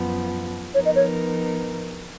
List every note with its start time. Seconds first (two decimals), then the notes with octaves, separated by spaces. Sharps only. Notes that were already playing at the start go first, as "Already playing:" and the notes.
Already playing: F#2 F3 B3
0.74 F3 B3 D#4 A#4 C#5
0.85 D#5
0.95 C#5